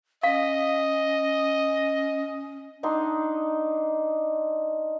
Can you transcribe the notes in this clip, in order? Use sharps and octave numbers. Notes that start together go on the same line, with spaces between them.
C#4 D#5 F5
D4 D#4 F#5 C6